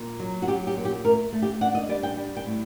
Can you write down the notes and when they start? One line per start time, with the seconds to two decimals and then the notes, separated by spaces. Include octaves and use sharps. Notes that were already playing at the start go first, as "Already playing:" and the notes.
Already playing: A#2
0.20 F#3
0.42 F#4
0.48 F#3 G4
0.67 G4
0.76 A#2
0.85 G4
1.05 A3 A#4
1.33 A3
1.42 G4
1.61 D4 F#5
1.75 D#5
1.89 G3 D5
2.03 G5
2.17 G3
2.36 G5
2.46 A2